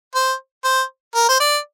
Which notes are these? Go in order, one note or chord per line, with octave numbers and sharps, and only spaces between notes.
C5
C5
A#4
C5
D5